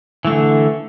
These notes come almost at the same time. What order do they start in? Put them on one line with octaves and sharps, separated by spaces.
E3 A3 D3